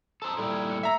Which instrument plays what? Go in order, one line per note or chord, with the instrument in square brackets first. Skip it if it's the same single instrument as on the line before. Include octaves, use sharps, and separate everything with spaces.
[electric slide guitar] A4 C5 [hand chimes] A5 A#5 D#6
[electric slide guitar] A#2 G3 E4 [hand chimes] A4 D5 B5
[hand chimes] G#6
A3 C#7
[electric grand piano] E5 A#5